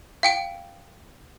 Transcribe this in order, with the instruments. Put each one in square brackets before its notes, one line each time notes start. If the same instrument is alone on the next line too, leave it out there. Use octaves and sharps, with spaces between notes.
[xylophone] F5 G5 D7